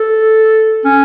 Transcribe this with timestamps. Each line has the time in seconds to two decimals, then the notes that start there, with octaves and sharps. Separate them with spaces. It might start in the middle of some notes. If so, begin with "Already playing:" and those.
Already playing: A4
0.85 C#4